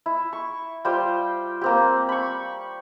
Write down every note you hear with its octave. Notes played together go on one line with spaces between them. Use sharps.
E4
C#6
G3 F4 C5 G5
A#3 C4 G4
B5 C#6